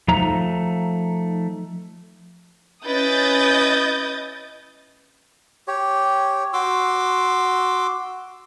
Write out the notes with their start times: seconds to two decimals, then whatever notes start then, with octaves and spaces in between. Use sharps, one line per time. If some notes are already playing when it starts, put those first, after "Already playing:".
0.08 F3 A3 D#4 A#5
2.85 C#4 E4 B4 D#5 D#6 G6 A6
5.68 G4 C#5
6.53 F#4 C6 D6 E6